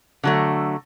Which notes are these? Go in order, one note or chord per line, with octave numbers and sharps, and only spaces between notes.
D3 F#3 A3